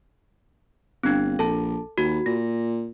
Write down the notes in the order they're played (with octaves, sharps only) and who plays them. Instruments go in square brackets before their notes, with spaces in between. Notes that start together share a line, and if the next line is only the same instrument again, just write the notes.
[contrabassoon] G1 [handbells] C4 D4
[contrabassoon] A#1 [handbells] A4 A5
[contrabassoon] D#2 [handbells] F#4
[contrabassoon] A#2 [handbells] A#6